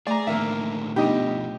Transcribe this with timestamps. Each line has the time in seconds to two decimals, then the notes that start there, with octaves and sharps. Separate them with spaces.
0.07 A3 G#4 D5 A#5
0.27 A2 D3 D#3 A#3 A#4 E5
0.96 B2 F3 B3 D4 D#4 G4 D#5 G5